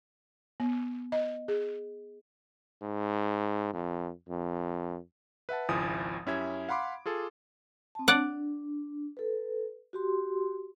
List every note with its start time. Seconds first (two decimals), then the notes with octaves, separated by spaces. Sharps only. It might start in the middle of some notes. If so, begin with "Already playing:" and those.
0.60 B3
1.12 D#5
1.48 G#4
2.82 G#2
3.73 F2
4.29 F2
5.49 B4 E5 F#5 A5
5.69 G#1 C#2 F3 E4 G#5 D#6
6.26 F#2 C#4 E4 G4 E5 G#6
6.69 F5 F#5 B5 C6 D6
7.06 F4 G#4 A4
7.95 C4 A5
8.08 D4 D5 F#5
9.17 A4 B4
9.93 F#4 G4 C6